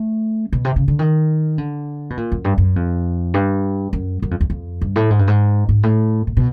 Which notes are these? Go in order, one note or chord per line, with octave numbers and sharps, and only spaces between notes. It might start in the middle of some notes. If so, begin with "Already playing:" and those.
Already playing: A3
B2
C3
C#3
D3
D#3
D3
B2
A#2
F#2
G2
F#2
F2
G2
F#2
F#2
F2
E2
F2
G2
A2
G#2
G2
G#2
G#2
A2
A#2
B2